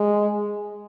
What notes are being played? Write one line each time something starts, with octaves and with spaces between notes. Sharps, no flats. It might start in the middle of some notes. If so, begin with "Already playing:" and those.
Already playing: G#3